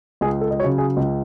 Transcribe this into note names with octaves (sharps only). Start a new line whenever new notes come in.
C#2 G#4
A4
D#5
C#3 F#3 C#5
G#4
C#2